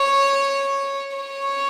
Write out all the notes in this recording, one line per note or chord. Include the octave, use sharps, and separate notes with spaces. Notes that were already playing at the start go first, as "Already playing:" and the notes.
Already playing: C#5
C#5